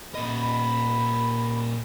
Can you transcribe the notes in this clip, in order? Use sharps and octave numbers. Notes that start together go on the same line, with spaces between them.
A#2 D#5 B5